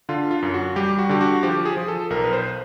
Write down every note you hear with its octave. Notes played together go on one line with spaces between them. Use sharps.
D3 F4
F4
F#2
F#4
G3 G4
F#4
D3 G4
F#4
F3 G4
G#4
F3
A4
B1 A#4
B4
C5